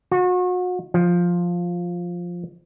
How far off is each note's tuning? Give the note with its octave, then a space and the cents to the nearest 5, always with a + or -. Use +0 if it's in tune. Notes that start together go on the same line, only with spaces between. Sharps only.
F#4 -35
F3 +5